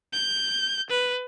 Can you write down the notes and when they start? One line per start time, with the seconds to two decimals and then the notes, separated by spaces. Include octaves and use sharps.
0.13 G6
0.90 B4